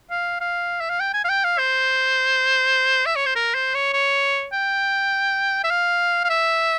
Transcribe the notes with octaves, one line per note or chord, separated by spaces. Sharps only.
F5
F5
E5
F5
G5
G#5
F5
G5
F5
C5
E5
C#5
C5
A#4
C5
C#5
C#5
G5
E5
F5
F5
E5